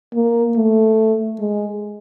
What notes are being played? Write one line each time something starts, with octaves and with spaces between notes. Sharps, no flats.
A#3
A3
G#3